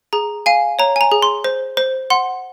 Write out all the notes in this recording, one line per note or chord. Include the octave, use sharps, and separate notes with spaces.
G#4 A#5
F5 G#5
C#5 A#5
G#5
A#5
G#4
C6
C5
C5
F#5 C6